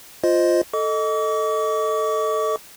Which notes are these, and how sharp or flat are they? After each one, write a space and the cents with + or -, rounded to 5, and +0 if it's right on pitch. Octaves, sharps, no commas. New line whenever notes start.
F4 +0 C5 +0 D#5 +0
A4 +0 D#5 +0 D6 -45